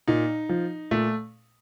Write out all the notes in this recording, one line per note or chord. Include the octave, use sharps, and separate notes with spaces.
A#2 D#4
F3
A#2 A3